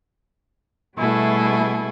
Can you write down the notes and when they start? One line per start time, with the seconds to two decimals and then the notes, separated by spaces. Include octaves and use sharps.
0.98 B2 G3 A3 E4 G#4 A4